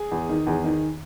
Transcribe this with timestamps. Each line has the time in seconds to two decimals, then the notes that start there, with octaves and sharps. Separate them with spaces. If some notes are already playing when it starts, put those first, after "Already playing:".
Already playing: G#4
0.12 E2
0.29 D#3
0.47 E2
0.64 D#3